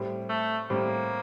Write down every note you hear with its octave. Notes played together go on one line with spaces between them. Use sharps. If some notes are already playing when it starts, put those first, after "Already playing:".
Already playing: A2 G3 C4 G4
A3
A2 G3 A#3 C4 G4